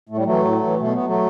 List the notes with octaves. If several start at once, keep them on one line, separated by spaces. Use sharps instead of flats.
A2 A3
G3
E3 F#3 A3
A2
E3
B2 A3
B3
F#3 A3